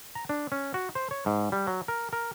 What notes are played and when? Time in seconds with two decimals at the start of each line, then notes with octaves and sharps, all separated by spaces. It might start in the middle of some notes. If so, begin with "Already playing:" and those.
0.15 A#5
0.29 D4
0.52 C#4
0.74 F#4
0.95 C5
1.11 C#5
1.26 G#2
1.52 G3
1.67 F#3
1.88 A#4
2.13 A#4